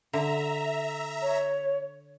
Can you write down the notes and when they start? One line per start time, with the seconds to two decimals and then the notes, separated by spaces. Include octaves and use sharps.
0.13 D3 E5 A#5
1.22 C#5